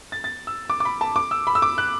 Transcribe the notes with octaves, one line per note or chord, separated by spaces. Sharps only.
A6
A6
E6
D6
D6
B5
A5
D6
E6
B5
E6
D6
F#6